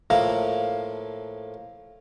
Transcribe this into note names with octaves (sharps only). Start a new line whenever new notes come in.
A2 F3 A#3 E4 A#5 D6